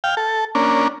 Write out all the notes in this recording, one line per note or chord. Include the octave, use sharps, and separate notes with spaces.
F5 G5
A4
A#3 C#4 D4